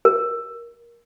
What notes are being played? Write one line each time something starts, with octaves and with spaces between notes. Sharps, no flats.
A#4